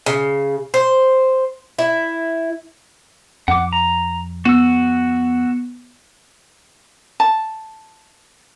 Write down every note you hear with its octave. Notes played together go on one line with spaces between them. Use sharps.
C#3
C5
E4
F2 F#5 D6
A#5
B3 F#4 E6
A5